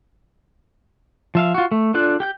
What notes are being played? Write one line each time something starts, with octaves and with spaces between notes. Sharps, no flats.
F3 E5 F5
F4 F#4
A3
D4 F4 A4 D5 F#6
G4 G5 G6